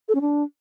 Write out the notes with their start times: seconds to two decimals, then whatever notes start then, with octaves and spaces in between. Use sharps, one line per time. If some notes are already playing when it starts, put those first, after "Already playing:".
0.08 A4
0.15 C#4
0.21 D4